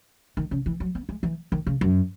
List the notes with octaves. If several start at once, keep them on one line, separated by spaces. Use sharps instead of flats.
D#3
C#3
E3
F#3
B3
G#3
E3
D#3
C#3
F#2